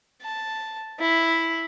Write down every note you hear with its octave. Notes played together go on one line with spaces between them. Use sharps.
A5
E4